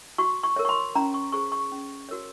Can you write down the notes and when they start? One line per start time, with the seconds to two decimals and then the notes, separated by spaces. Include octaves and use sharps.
0.18 F#4 C#6
0.43 C#6
0.56 A#4 C#5
0.65 C#6
0.69 C6
0.95 C#4 A#5
1.14 C#6
1.32 G#4 C5 C#6
1.52 C#6
1.72 C#4
2.09 F#4 A#4 C#5